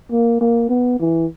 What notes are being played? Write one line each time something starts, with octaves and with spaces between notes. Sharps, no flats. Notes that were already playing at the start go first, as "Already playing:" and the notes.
A#3
A#3
B3
E3